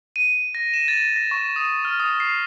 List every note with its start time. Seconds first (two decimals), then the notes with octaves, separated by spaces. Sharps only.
0.16 D#7
0.55 A#6
0.74 E7
0.88 A6
1.16 A#6
1.31 C#6
1.56 D#6
1.85 F6
2.00 D#6
2.20 C7